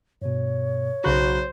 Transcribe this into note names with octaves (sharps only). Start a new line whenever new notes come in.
G2 B2 C#5
B1 C#3 F#4 C5 A#5 B5 F#6